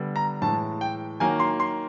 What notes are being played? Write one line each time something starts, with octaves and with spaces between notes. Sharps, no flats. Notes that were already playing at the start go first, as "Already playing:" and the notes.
Already playing: D3 G3 B3
A#5
A2 E3 G#3 A5
G5
D#3 F#3 A#3 G#5
C6
C6